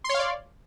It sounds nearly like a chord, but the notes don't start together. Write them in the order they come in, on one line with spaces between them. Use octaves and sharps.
C6 C#5 F5 D5